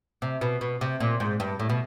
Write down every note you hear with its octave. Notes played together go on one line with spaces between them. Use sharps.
C3
B2
B2
C3
A#2
G#2
G2
A2
B2